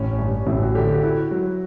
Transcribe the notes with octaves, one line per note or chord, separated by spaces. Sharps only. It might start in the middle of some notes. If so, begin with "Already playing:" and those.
Already playing: A1 C#4
G2
A1 E4
F#4
D3 G4
F#4
E4 F#4
F#3